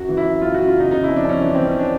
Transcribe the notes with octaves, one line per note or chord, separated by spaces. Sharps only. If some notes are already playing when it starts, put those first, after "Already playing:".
Already playing: F#2 F#4
E3
E4
F#2
F#2 F4
F#2 F#4
F4
C#3 D#4
C#3 D#4
F2 E4
D4
F2 C#4
E3 D4
E3 C4
C#4
D4